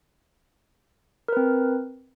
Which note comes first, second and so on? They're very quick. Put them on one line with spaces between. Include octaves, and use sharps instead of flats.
A#4 B4 C4